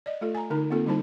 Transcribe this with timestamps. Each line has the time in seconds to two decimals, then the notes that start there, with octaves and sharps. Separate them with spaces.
0.06 D5 D#5
0.21 A3 F4 A4
0.35 G#5 A#5
0.50 D3 D#4 A#4
0.70 A#3 C4 F4 A4
0.86 D3 G3 D#4 E4 C5 A5